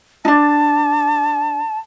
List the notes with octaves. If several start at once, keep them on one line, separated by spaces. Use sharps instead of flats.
D4 D#4 A5